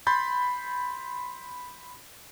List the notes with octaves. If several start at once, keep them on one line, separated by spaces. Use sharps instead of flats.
B5 C6 G6 A6